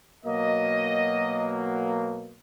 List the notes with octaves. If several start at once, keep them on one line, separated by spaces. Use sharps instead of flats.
B2 F#3 A#3 D#5